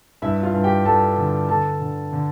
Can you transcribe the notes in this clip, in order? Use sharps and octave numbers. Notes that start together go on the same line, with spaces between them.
G2 E4 E5
F4 F5
G2
G4 G5
G2 A4 A5
D3
D3 A4 A5
D3
D3